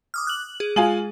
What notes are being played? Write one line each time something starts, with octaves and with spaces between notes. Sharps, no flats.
D6 D#6 F6
F#6 F#7
G#4
G#3 F4 G#5 F#7